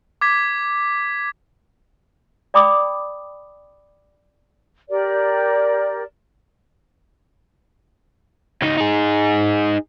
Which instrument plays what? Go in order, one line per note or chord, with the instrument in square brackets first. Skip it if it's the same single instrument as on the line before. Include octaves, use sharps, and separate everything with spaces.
[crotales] D6 G#6 B6
[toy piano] D5 G5 B5 D6 D#6
[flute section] G4 A#4 D5
[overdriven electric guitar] C#2 D#4
D#4 G#4